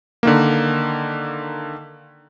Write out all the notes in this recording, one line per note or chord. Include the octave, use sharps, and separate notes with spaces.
D3 D#3 A#3